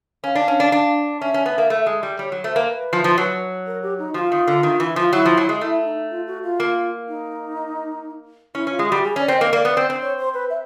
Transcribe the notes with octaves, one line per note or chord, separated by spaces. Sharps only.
C#4 F5
D4
C#4
D4
D4
C#4 E5
C#4
B3
A#3
A3
G#3
G3
G3 C#5
F#3
A3 C5
A#3
B4
F3
F3
F#3
A#4
G4
D#4
F3 F4 F#4
D#3
D3
D#3
E3
F3 F4
F#3 E4
F3
F#3
G#3
A3 E4
D#4
F4
F#4
F4
A#3
D#4
C#4 E4
C#4 F4
G#3
G3 F#4
G#4
C#4 D5
C4
A#3 D#5
A#3 D5
B3
C4
C4
C#5
C5
B4
E5